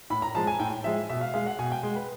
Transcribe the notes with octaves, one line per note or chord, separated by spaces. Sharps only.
A2 B5
A#5
F3 G#3 A5
G#5
A2 G5
F3 G#3 E5
B2 E5
F5
G#3 F5
F#5
B2 G#5
G5
G#3
B4